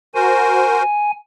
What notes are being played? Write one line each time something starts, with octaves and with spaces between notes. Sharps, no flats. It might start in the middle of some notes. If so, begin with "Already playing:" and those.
F#4 A#4 C5 G#5